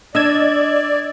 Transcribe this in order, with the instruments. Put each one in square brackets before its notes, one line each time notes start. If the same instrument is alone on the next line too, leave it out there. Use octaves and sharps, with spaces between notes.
[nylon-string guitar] D4 [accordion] D5 [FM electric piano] D#5 E6 G#6